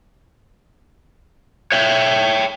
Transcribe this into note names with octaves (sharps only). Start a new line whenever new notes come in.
C#5 E5 G5